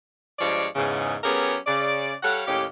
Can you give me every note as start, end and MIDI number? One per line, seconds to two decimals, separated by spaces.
0.39 0.66 43
0.39 0.66 53
0.39 0.66 56
0.39 0.66 73
0.39 0.66 74
0.75 1.16 40
0.75 1.16 44
0.75 1.16 49
1.24 1.56 54
1.24 1.56 59
1.24 1.56 61
1.24 1.56 67
1.24 1.56 68
1.24 1.56 70
1.67 2.13 49
1.67 2.13 74
2.23 2.42 55
2.23 2.42 69
2.23 2.42 73
2.23 2.42 77
2.23 2.42 78
2.47 2.64 39
2.47 2.64 45
2.47 2.64 61
2.47 2.64 67